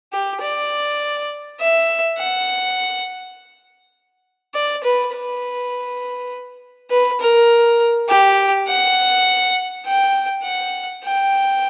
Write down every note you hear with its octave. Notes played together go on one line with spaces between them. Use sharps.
G4
D5
E5
F#5
D5
B4
B4
B4
A#4
G4
F#5
G5
F#5
G5